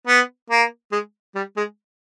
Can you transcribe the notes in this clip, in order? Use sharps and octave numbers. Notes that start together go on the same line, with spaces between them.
B3
A#3
G#3
G3
G#3